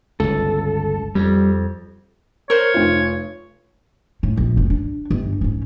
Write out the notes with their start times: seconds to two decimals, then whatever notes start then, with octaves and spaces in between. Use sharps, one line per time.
0.20 G1 C#2 A4
1.15 F2 G3
2.50 A#4 C5 C#5
2.74 F1 F4
4.23 A2
4.37 A#1
4.57 F#1 D2
4.70 D4
5.11 G1
5.41 G#2 C#4